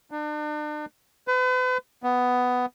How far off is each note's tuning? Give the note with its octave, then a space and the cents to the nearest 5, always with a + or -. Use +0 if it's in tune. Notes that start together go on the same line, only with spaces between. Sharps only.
D4 +40
B4 +40
B3 +10